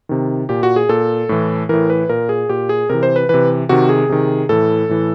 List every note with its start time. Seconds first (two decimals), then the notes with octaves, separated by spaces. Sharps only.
0.09 C3 D#3
0.49 A#2 G4
0.63 F#4
0.76 G#4
0.89 A#2 A4
1.29 A2 E3
1.69 A2 E3 A#4
1.90 B4
2.09 A#2 A#4
2.29 G#4
2.49 A#2 G4
2.69 G#4
2.89 C3 E3 A#4
3.03 C5
3.16 B4
3.29 C3 E3 B4
3.69 C3 D#3 F#4
3.89 G#4
4.09 C3 D#3
4.49 A2 E3 A4
4.89 A2 E3